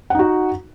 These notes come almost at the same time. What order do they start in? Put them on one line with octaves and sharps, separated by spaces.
F#5 D#4 F#4